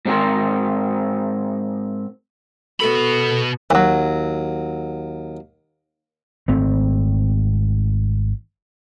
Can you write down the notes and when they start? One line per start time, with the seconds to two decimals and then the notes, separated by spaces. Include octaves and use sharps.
0.05 G#2 C4 F#4 A#4 C5
2.80 B2 B3 F#4 A4 B5
3.70 D#2 E3 F#3
6.48 G#1 A3 C4